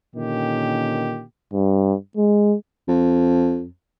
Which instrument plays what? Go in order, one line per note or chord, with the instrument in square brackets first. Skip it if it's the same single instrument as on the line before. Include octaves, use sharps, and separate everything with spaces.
[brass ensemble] A#2 D3 D#3 C#4 G4
[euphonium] G2
G#3
[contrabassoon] F2